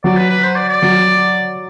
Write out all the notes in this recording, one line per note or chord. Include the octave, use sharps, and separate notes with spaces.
F#3 D5
B4
B4
C5
D5
D5
F#3